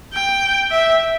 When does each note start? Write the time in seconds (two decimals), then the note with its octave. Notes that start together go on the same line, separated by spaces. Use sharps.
0.12 G5
0.71 E5